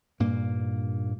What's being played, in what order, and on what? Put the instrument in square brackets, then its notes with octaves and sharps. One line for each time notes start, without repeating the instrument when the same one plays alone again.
[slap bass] G2 A#2 A#3